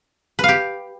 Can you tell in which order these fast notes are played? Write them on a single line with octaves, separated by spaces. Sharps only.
B4 F5 G4